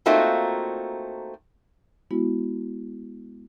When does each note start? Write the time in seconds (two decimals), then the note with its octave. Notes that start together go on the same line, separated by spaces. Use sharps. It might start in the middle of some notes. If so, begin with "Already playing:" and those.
0.06 A3 A#3 C4 D#4 F4 F#4
2.11 G#3 B3 E4 F#4